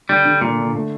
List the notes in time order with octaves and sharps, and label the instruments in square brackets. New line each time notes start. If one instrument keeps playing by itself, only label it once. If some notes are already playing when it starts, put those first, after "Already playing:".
[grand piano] D3 [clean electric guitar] G3
[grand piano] D3
[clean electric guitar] A#2 [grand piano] D3
[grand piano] D3
A3